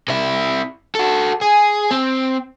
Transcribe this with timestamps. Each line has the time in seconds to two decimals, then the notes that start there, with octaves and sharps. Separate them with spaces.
0.08 C3 E4
0.95 F#4 A4
1.41 G#4
1.91 C4